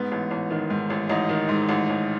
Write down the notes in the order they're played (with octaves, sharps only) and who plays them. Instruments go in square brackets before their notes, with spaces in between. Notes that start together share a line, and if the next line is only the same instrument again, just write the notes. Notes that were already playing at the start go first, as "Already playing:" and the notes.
Already playing: [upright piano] G#2 B3
A1
A1
D#3
G#2
A1
A1 D#4
D#3
G#2
A1
A1